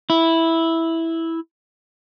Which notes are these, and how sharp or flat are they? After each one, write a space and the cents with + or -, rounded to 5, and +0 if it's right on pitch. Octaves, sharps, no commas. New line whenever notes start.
E4 -5